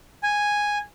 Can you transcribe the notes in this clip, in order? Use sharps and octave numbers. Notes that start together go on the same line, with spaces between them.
G#5